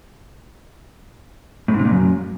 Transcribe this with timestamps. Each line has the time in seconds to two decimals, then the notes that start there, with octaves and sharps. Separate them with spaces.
1.68 A2
1.74 G#2
1.79 C3
1.85 A#2
1.90 F#2